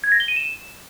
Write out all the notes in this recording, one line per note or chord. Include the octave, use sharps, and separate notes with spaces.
G#6
A#6
G7
D#7
E7